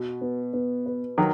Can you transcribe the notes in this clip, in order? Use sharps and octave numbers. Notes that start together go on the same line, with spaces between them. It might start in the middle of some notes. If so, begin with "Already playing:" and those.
Already playing: B2 F#4
B3
B3
B4
D#3 F#3 A#4